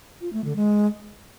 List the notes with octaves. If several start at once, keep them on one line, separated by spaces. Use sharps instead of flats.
F4
A3
D3
G#3